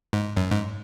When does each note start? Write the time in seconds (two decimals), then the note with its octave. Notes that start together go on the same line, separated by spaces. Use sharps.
0.13 G#2
0.37 F#2
0.51 G#2